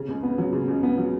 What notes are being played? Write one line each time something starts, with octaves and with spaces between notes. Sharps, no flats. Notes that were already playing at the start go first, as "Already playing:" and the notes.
Already playing: C#3
C#2
B3
F#3
C#3
C#2
B3
F#3